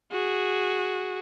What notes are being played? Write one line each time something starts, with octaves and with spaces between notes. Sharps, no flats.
F#4 G#4